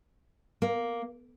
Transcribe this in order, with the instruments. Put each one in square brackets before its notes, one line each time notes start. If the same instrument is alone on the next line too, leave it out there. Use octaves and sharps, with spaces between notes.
[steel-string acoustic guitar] A#3